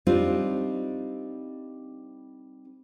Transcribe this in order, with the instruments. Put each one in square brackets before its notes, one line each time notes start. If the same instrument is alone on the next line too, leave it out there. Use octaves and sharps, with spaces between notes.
[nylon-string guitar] G3 C4 D4 D#4 F4